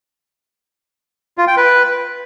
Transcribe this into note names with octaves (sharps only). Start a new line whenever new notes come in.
F4
G5
B4